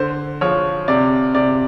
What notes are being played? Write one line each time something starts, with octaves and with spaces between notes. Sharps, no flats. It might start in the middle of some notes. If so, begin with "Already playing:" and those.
Already playing: D3 C5
F3 C#5
C3 D5
C3 D5